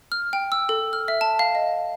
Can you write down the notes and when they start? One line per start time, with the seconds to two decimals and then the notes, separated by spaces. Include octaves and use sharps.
0.12 F6
0.33 G5
0.52 E6
0.69 A4
0.93 F6
1.08 E5
1.21 A5
1.39 F5
1.55 D#5